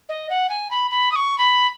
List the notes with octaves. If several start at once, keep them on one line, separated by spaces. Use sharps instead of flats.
D#5
F#5
G#5
B5
B5
D#6
C#6
B5